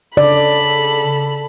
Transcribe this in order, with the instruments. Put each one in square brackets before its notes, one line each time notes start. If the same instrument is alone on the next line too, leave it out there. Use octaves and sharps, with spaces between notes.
[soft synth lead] C#3 [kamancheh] A4 B5 [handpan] D5